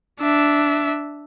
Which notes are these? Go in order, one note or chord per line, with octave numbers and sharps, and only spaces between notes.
D4 E5